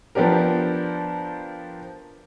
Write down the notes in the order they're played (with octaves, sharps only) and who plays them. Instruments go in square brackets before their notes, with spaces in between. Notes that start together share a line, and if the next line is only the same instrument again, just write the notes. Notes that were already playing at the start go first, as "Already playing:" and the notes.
[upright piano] F3 B3 D4 G4 A#4